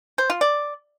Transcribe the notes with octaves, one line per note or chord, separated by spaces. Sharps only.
C5
F4
D5